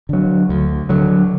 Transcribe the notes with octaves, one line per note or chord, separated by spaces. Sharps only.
D3 F#3
D2
D3 F#3